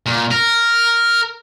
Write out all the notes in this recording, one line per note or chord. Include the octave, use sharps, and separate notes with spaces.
A#2
A#4